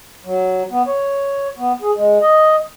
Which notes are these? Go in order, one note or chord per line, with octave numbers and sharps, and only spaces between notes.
F#3
B3
C#5
B3
G#4
G#3
D#5